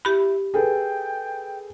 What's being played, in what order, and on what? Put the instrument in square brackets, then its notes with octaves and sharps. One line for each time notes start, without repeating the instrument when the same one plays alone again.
[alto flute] E4 [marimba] G4 B5
[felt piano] G#4 A4 B4 [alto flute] G5